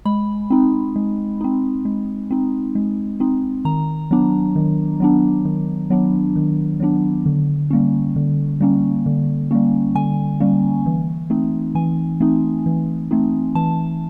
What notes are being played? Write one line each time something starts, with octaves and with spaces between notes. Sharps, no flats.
G#3 B5
C4 D#4
G#3
C4 D#4
G#3
C4 D#4
G#3
C4 D#4
D#3 A#5
F#3 B3 D4
D#3
F#3 B3 D4
D#3
F#3 B3 D4
D#3
F#3 B3 D4
D3
G3 A#3 C#4
D3
G3 A#3 C#4
D3
G3 A#3 C#4
D3 G#5
G3 A#3 C#4
E3
A3 C4 D#4
E3 G#5
A3 C4 D#4
E3
A3 C4 D#4
E3 A5